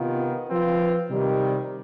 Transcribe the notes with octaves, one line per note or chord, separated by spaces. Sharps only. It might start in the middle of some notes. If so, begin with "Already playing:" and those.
Already playing: C3 D#3 B3 F4
F3 C4 F4 B4
C3 D#3 G3